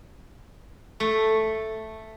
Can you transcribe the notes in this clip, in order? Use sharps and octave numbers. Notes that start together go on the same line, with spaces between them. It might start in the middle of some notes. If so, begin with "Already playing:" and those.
A3